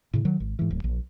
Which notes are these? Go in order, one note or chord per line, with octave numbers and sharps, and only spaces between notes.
A2 C#3
D#3 F#3
G#1
G#2 E3
D1
A#1